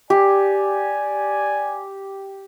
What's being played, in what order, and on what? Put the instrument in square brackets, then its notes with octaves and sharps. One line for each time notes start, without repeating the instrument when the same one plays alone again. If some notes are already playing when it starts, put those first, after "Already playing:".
[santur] G4 [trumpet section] D5 G#5